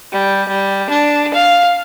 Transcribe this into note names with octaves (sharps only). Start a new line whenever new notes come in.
G3
G3
D4
F5